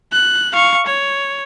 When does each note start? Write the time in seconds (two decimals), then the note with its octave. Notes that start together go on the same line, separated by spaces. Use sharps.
0.12 F#6
0.53 F5 C#6
0.86 C#5